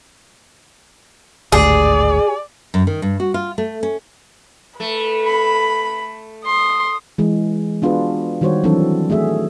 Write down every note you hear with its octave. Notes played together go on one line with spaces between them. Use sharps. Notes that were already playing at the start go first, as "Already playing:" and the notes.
G#1 D2 A2 G#4 D5
F#2
D#3
G2
F#4
F4
A3
C#4
A3 B4
B5
C6 D#6
E3 G#3
B3 D4 F4 F#4 G#4 B4
D#3 G3 F#4 C5 C#5
E3 F#3 C4 D4 A4
A3 F#4 G#4 E5